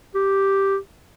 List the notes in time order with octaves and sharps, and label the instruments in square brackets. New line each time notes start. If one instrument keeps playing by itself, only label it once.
[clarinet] G4